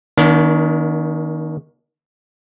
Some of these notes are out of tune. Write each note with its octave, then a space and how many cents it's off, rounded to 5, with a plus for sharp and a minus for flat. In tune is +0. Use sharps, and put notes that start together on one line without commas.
D#3 +10 A#3 +45 D4 -40